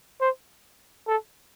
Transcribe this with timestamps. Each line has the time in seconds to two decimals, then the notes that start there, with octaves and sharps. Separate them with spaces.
0.21 C5
1.08 A4